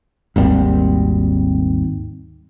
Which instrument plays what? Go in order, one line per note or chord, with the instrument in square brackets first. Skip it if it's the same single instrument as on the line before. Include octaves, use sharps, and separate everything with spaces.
[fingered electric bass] G#1 D#2 G3 C4